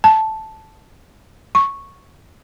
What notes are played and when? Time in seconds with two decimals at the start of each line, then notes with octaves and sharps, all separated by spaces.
0.04 A5
1.55 C#6